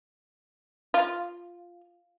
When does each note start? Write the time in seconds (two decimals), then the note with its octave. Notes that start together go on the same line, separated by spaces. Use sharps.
0.94 F4